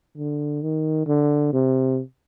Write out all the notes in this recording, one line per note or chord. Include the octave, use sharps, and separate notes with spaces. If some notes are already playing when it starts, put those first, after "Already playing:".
D3
D#3
D3
C3